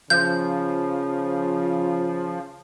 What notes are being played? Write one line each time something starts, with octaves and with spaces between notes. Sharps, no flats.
C#3 F3 G6